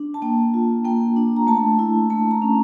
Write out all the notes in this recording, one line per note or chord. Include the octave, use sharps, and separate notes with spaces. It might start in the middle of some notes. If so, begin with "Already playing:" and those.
Already playing: D4
A5
A#3 G5
F4
A#3 G5
D4
A#5
A3 A5
E4
A3 A5
A#5
C#4